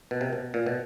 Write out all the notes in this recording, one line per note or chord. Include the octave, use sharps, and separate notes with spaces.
B2
C3
B2
A#2
B2